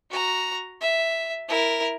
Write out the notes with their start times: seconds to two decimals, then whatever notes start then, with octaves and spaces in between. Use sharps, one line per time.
0.11 F#4 A#5
0.81 E5
1.48 E4 A#4